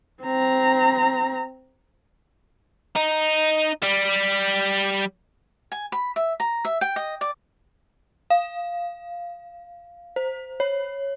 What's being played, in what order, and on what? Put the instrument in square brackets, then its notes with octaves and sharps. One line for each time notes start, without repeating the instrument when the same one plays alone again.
[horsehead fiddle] C4 A#5
[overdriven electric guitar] D#4
G3
[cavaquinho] G#5
B5
E5
A#5
E5
G5
D#5
D5
[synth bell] F5
C5
C#5